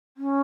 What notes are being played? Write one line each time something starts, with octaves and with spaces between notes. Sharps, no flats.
C#4